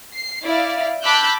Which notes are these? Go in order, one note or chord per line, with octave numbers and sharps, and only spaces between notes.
C7
E4 D5 F5
A5 B5 D6 E6 F#6 G6